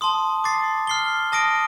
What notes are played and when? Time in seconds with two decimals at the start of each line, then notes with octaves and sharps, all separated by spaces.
0.01 A5 C6 D#6
0.44 D6 A6 C7
0.87 F6 C7 G7
1.32 A5 D#6 A#6 D7